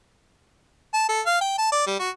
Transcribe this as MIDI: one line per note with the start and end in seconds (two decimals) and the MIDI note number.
0.93 1.06 81
1.09 1.21 69
1.26 1.40 77
1.41 1.57 79
1.58 1.67 81
1.72 1.85 74
1.87 1.96 55
2.00 2.10 66